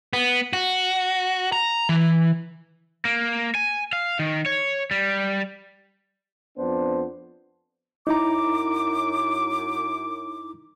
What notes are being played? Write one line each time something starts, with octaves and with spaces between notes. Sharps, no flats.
B3
F#4
A#5
E3
A#3
G#5
F5
D#3
C#5
G3
F2 B3 D4 C5
F#2 D#4 E4 A#5 D6